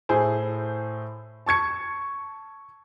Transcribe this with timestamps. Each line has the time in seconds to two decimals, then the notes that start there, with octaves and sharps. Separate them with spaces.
0.09 A2 E4 G#4 C5
1.46 A5 C#6 G#6 C#7